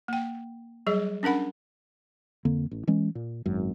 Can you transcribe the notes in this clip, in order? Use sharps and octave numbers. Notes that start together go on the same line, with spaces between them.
A#3 G5
F#3 G3 G#4 D#5
C#4 D4 A#4 F#5 B5
F2 D3 A#3
A1
E3 G#3 C#4
A#2
G#1 F#2